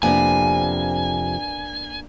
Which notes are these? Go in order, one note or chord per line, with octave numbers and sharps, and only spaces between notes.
F2 C3 A#3 B3 D4 G#5